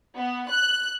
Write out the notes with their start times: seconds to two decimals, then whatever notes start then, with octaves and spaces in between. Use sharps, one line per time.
0.16 B3
0.49 F#6